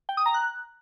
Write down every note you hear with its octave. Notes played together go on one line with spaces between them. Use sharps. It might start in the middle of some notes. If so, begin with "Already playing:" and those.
G5
D#6
A#5
F#6